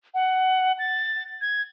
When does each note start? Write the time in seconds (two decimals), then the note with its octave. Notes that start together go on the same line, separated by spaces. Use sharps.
0.14 F#5
0.79 A6
1.41 G#6